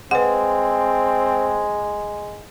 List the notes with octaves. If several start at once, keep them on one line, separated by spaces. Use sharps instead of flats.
G#3 C4 B4 F#5